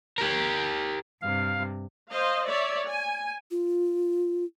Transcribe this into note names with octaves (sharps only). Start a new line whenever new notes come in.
G4 A#4
G2 C3 F5
C5 D#5 F5
C#5 D5 E5
G#5
F4